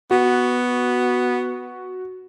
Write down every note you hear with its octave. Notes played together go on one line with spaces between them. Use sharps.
B3 F#4